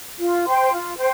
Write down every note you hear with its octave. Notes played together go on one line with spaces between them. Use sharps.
F4
C5 G5 C6
F4
C5 G5